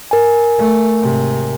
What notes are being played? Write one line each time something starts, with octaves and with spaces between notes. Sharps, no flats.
A#4 G#5
A3
G#1 C3